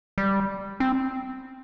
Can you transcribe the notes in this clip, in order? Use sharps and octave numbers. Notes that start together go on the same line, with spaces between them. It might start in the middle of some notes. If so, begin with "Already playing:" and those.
G3
C4